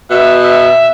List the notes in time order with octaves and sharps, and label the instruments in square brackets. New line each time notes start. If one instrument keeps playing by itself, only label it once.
[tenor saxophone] B2 [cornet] E5
[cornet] E5